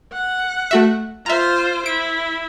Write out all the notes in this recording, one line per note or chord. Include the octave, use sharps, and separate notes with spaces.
F#5
A3 F#4 E5
F4 C5 E5 A#5
E4 D7